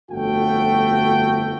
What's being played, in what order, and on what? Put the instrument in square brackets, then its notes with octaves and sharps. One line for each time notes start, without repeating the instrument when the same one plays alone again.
[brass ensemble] G1 F2 A3 F#4 G5